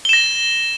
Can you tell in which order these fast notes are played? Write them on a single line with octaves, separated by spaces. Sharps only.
G7 E7 A#6